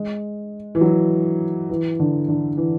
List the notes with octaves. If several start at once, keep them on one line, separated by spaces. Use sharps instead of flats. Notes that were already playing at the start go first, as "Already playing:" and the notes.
Already playing: G#3
E3
F#3
E3
D3
D3
E3